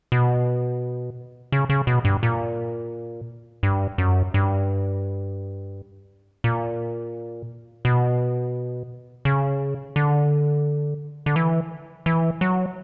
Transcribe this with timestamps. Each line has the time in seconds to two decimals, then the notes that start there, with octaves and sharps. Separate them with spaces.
0.12 B2
1.52 C#3
1.70 C#3
1.87 B2
2.05 G2
2.23 A#2
3.63 G2
3.98 F#2
4.34 G2
6.44 A#2
7.85 B2
9.25 C#3
9.96 D3
11.26 D3
11.36 E3
12.06 E3
12.41 F#3